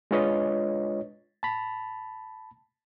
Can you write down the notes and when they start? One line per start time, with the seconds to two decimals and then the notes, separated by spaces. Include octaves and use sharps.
0.11 G#3 D4 F4 B4 C#5 D#5
1.43 A5 B5